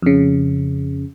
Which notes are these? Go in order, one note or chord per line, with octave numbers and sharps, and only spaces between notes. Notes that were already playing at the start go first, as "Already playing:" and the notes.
F2 C#3